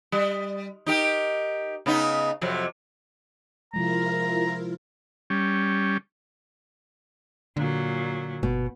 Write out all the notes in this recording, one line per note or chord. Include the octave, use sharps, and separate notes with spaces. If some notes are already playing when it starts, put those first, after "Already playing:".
G3
D#4 G4 A#4
C#3 B3 D#4
F2 C3 F#3
C3 F3 G#3 E4 F4 A#4 A#5
G3 C#4
A#2 D3 F#3
G1 B2